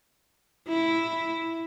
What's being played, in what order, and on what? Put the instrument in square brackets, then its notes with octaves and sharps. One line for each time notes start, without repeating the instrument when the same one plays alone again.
[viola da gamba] E4